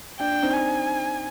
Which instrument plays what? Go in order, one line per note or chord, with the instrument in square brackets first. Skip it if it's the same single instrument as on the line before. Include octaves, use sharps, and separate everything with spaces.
[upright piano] D4 [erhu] G5
[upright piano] D4
C4 D#4
[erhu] G#5